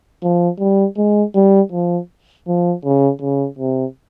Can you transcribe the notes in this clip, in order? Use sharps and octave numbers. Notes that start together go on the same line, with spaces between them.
F3
G3
G#3
G3
F3
F3
C#3
C#3
C3